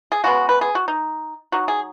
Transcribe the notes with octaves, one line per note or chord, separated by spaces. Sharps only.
G#4
C#3 G#3 B3 F#4
B4
G#4
F#4
D#4
F#3 D#4 F#4
G#4